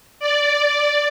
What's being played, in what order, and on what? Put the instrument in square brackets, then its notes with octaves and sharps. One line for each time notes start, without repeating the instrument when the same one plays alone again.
[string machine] D5